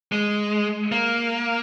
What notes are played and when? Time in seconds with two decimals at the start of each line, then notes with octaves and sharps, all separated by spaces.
0.12 G#3
0.92 A#3